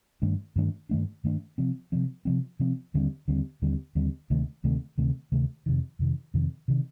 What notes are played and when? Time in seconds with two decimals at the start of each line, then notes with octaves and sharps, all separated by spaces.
0.22 G2 D#3 A3 D4
0.56 G2 D#3 A3 D4
0.89 G2 D#3 A3 D4
1.24 G2 D#3 A3 D4
1.58 C3 F3 C4
1.92 C3 F3 C4
2.25 C3 F3 C4
2.59 C3 F3 C4
2.94 D#2 D3 G3 C4
3.28 D#2 D3 G3 C4
3.62 D#2 D3 G3 C4
3.95 D#2 D3 G3 C4
4.30 D2 C3 D#3 A3
4.64 D2 C3 D#3 A3
4.98 D2 C3 D#3 A3
5.32 D2 C3 D#3 A3
5.66 F2 C3 D#3
5.99 F2 C3 D#3
6.34 F2 C3 D#3
6.68 C3 D#3